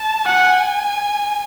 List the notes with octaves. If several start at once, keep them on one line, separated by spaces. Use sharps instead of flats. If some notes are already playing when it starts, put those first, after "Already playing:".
Already playing: A5
F#5 G#5